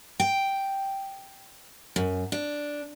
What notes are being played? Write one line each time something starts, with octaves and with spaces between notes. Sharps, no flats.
G5
F#2
D4